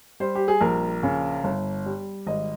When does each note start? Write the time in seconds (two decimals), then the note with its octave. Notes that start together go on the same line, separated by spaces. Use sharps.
0.20 G3 C5
0.35 G4
0.48 G#4
0.61 A#1 A#4
1.03 C#3
1.44 G1
1.86 G3
2.27 G#1 D#5